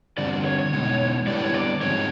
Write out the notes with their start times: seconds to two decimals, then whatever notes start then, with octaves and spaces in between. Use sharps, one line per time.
0.18 D3 G3 C4 D5
0.45 C#5
0.59 C#5
0.72 B2 G#3 B3 D#4
1.27 D3 G3 B3 E4 G4 D5
1.44 C#5
1.54 D5
1.81 G#2 F3 G#3 C4 D#4 C#5